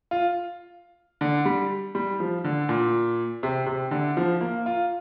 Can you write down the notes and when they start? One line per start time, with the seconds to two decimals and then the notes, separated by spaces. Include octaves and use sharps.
0.11 F4
1.21 D3
1.45 G3
1.95 G3
2.20 F3
2.44 D3
2.69 A#2
3.43 C3
3.66 C3
3.91 D3
4.17 F3
4.41 A#3
4.66 F4